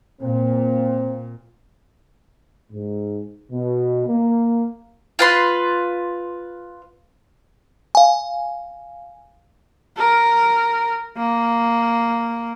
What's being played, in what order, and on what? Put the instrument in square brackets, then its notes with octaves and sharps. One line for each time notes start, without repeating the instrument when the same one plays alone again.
[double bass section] A#2 [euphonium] C4
[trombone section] G#2
B2
A#3
[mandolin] F4 B4 C6
[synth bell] F5 G#5
[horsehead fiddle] A#4
A#3